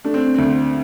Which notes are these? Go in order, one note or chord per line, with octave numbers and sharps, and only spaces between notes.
A3 D4
C4
D2 C4